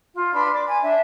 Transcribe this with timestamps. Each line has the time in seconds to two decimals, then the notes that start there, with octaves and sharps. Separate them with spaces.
0.14 F4
0.33 D4 B4 B5 C6
0.53 D5 D6
0.68 G#5
0.81 D4 E5